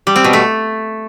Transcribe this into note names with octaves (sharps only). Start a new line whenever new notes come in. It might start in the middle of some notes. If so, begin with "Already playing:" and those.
G3
C4
B2
A3